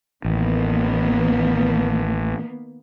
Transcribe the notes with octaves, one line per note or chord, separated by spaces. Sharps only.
A1 D#3 A#3 B3